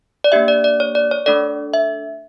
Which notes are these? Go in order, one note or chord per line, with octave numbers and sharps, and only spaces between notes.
D5
A#3 D4 G4 E5
D5
D5
C#5
D5
C#5
A3 D4 A4 D5
E5